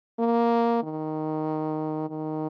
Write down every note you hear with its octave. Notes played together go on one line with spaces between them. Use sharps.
A#3
D#3
D#3